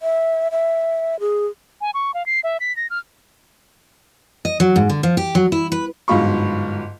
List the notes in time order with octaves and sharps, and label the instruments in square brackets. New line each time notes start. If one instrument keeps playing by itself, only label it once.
[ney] E5
E5
G#4
[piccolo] G#5
C#6
F5
C7
E5
B6
A#6
F6
[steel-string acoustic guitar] D#5
F#3
G#2
D3
F3
G4
F#3
E4
B4
[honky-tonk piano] G1 G#2 F#3 F4 B5 C#6